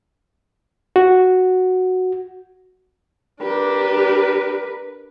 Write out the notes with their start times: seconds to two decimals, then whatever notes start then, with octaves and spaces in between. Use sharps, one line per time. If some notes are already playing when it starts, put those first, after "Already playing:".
0.96 F#4
3.42 D4 G4 A#4 B4